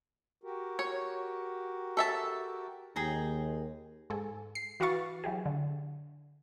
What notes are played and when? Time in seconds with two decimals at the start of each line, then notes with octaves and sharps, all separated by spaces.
0.44 F#4 G4 A#4
0.79 C#5
1.97 A4 E5 A5
2.96 D#2 G#4 G5 A#5
4.10 G#2 A4 G#5
4.55 C7
4.80 E3 F#4 B4 F5 C#6 A6
5.24 F#3 E4 G4 G#4
5.46 D3